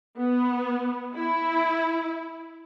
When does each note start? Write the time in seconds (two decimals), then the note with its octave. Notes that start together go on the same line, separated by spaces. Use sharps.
0.17 B3
1.15 E4